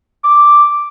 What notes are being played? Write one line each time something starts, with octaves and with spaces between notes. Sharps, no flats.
D6